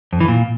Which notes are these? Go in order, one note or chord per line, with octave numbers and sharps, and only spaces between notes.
F2
E3
A#2